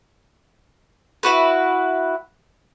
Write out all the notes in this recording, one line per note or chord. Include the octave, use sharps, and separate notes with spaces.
E4 F#4 B4